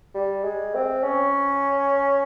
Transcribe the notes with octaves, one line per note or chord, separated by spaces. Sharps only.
G3
G#3
C4
C#4